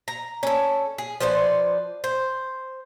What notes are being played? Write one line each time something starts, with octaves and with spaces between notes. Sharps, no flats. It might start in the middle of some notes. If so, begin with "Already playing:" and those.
A#5
C#4 A4
G#4
F3 B4 C5 D5
C5